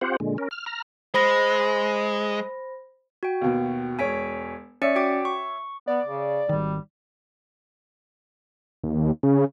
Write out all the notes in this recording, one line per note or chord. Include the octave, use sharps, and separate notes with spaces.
C4 F4 G4 C5 F#5
A#2 D3 G#3
C#4 A#4
F6
A#5 F6
G#3 C5 B5 A#6
F#4 G5
D#2 B2
E1 C#5 G#5 B6 D7
C#4 C#5 D5 E5 C#7
F#4 G5 D6
C#6
B3 D5
C#3
G#1 D#3 G3
D#2
C#3